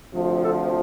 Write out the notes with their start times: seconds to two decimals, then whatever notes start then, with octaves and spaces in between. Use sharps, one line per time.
0.13 D2 C3 F3
0.42 A4